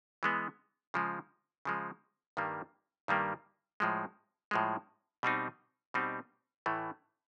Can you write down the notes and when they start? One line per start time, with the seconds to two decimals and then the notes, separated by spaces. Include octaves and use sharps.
0.23 E3 G#3 B3
0.94 C#3 F3 G#3
1.65 C#3 F3 G#3
2.37 G2 D#3 G3 A#3
3.08 G2 D#3 G3 A#3
3.80 A2 F3 G#3
4.51 A2 F3 G#3
5.23 B2 G3 C4 D#4
5.94 B2 G3 C4 D#4
6.66 A2 E3 A3